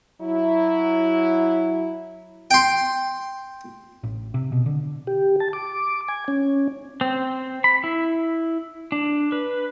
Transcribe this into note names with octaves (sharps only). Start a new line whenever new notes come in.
F#3 E4
G5 C6
A1
C3
B2
D3
G4
A5
D6
G#5
C#4
C4
B5
E4
D4
B4